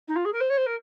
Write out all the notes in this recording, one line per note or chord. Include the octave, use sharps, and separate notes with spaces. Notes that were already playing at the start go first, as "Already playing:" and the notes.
D#4
F4
G#4
A#4
C5
C#5
C5
A#4